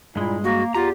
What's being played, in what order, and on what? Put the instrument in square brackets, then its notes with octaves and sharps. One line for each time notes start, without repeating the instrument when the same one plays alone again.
[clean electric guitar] G2 G#3 [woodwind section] A#2 E4
[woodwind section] A#3 [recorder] F#4
[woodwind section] E2 G4 [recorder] F4 [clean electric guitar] A#5